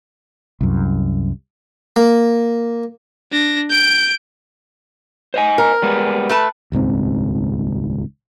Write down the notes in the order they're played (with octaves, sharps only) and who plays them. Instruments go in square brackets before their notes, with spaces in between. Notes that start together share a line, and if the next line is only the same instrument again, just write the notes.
[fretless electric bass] C2 F#2
[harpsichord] A#3
[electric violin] D4 A#6
G6 D7
[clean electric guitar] C5 D#5 G#5
[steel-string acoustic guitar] A#4
[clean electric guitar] G3 G#3 B3
[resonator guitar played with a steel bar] A3 B4 A5
[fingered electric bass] D#1 C#2 G#2 C4